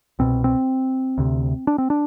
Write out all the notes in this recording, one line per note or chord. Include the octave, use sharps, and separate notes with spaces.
C2 B2 C4
C4
D2 C3
D4
C4
D4